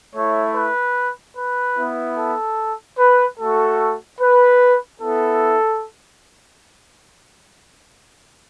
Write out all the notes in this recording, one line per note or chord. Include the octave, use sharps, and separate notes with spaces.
A3 E4 C#5
B4
B4
B3 E4
A4
B4
A3 F#4 A4
B4
B3 E4 A4